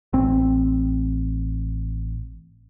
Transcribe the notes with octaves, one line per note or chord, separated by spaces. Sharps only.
A1 C4